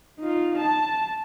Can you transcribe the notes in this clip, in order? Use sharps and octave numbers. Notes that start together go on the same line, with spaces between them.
D#4 F4
A5